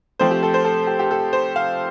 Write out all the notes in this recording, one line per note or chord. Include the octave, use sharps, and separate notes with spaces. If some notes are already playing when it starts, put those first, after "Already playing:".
F3 A3 C4 C5
G4
A4
C5
A4
G4
G4
A4
C5
F5